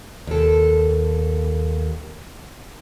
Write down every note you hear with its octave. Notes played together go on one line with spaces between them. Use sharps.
D#2 A4